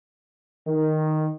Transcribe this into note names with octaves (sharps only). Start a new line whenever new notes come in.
D#3